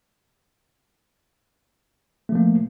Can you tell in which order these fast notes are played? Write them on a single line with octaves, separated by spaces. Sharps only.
A3 F3 A#3